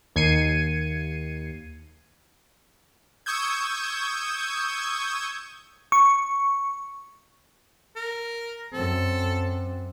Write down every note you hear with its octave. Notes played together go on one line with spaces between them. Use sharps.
D#2 G#6 C7 C#7 D#7
C#6 D#6 E6 G6 G#6
C#6
A#4
F#2 C4 A4